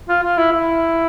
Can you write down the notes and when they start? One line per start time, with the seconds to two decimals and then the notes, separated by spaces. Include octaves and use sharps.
0.09 F4
0.23 F4
0.37 E4
0.52 E4